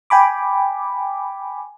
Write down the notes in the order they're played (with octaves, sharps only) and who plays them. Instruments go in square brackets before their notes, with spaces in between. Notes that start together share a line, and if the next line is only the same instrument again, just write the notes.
[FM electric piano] G5 G#5 B5 D6